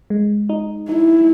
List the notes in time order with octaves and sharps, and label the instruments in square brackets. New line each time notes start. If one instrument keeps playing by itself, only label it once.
[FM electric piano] G#3
D#4
[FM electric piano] D#4 [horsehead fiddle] E4